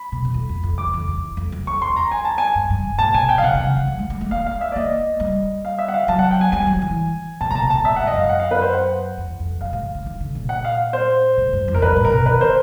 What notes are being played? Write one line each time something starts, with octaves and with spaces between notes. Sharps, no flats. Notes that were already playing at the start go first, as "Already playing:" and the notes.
Already playing: B5
B2
F#2
F2
E2
F2
E2 D6
F2
E2
F2
F#2
F2 C#6
C6
E2
A#5
G#5
A5
G#5
G2
G2
G#2
A#2 A5
B2 G#5
B2 G5
F5
C3 F#5
C#3
D3
F3
F#3
G#3
G#3
A3
A#3 F5
F5
E5
D5
A#3 D#5
G3
F5
E5
F#5
F5
F#3 A5
F#5
G5
G#5
G3 G#5
F#3
E3
A#2 A5
B2 A#5
A5
B2
A#2 A5
A2 E5
G#2 F#5
D#5
F#2 F5
F#5
F5
B4
C5
F#5
E2
F2
F#2 F5
G#2
D3
D#3
D3
A#2
F#5
F5
C5
A2
G2
F2
A#4
G2 B4
A2
A#4
B2
D#3 B4
C5